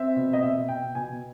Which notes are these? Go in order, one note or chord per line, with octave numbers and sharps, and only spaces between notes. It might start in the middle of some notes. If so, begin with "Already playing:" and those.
Already playing: C4 E5
B2
D#5
B2 E5
B2 G5
B2 G#5